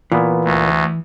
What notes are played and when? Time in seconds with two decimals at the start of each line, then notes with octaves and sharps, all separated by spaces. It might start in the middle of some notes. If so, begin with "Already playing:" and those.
0.12 A#2 E3 B3
0.44 D2